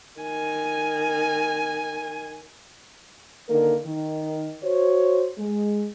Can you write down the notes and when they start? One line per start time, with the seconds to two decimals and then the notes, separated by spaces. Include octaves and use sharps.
0.21 D#3 G#5
3.49 D3 D#3 A#3 A#4
3.85 D#3
4.63 F#4 C5 C#5
5.37 G#3